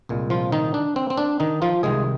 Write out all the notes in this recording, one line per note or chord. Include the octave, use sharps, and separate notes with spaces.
C2 A#2 G#3
F3 F4
D#3 D#4
D4
C4
C4
D4
D#3 D#4
F3 F4
C2 C3 D#3 G#3 G#4